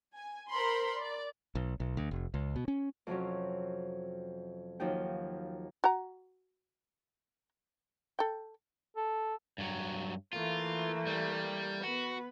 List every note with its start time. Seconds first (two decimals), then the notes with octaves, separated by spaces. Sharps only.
0.15 G#5
0.51 A#4 C5 B5 C6
0.97 D5
1.55 B1
1.80 B1
1.97 D2
2.11 F1
2.34 C#2
2.56 B2
2.68 C#4
3.07 F2 C3 F#3 C#4
4.80 D#2 F3 F#3 D#4 F#4 G5
5.84 F#4 A#5
8.19 A4 G5
8.97 A4
9.58 G2 F#3
10.33 E3 A3 A#3 F4
11.07 G3
11.83 B3 F#4 B4